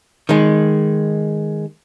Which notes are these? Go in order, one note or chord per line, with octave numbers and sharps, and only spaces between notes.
D#3 G#3